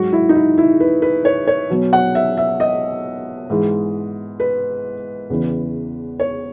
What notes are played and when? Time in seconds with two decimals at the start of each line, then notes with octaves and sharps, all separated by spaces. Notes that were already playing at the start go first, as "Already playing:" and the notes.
Already playing: G#2 F#3 F#4
0.13 E4
0.29 D#4
0.35 E4
0.58 E4
0.80 B4
1.02 B4
1.25 C#5
1.47 C#5
1.70 B2 F#3
1.93 F#5
2.15 E5
2.37 E5
2.60 D#5
3.50 G#2 E3 G#3
4.40 B4
5.30 E2 C#3 E3
6.20 C#5